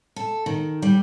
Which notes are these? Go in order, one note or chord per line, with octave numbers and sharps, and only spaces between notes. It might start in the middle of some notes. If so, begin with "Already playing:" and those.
A4
D#3
G3